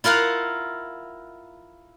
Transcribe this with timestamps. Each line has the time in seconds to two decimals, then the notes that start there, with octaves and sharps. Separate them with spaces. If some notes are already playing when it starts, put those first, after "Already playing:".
0.04 E4 F4 A#4 F5 F#5